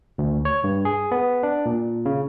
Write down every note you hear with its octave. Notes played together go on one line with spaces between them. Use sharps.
D2
C#5
G2
G#4
B3
D4
A#2
C#3